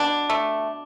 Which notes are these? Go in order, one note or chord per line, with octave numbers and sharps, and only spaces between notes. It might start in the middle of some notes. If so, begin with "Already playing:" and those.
Already playing: B2 D4
A3